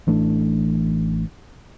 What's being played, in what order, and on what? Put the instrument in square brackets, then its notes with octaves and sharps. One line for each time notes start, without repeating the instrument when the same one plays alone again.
[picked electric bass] A1 E3 A3 D4